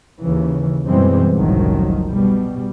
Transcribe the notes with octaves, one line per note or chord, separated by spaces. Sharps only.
D#2 C#3 E3
F#2 B2 E3 G3 G#3 C4
F#1 C2 A2 D#3 F3 F#3
B2 G3